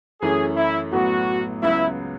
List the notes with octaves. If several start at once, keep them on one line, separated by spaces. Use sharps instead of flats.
F#2 E3 A3 C#4 G#4
E4
A1 A2 F#3 B3 F#4
C#2 C#3 F#3 B3 E4